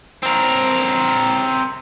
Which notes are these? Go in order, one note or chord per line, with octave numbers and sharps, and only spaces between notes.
C4 A#4